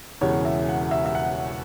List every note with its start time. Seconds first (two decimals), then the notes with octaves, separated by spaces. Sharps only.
0.21 E1 E2 C#3 E3 C#5
0.45 E5
0.69 F#5
0.91 E5
1.06 E5
1.15 F#5